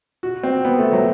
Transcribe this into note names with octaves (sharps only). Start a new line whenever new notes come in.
F#4
C4
B3
A3
F#3